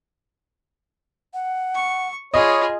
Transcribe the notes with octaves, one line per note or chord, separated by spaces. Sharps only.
F#5
C#6
F4 G#4 C#5 D#5 B5